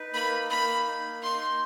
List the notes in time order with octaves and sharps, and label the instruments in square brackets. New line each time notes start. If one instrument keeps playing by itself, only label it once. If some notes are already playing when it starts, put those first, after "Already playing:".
Already playing: [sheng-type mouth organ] D#4 B4
[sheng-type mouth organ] A#3 [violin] B5
[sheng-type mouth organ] A#3 [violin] B5
[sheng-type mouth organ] D#4
[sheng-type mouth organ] D#4 [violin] C6